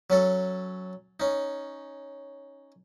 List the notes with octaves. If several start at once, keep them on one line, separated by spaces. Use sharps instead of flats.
F#3 C#4 A4
C#4 D#4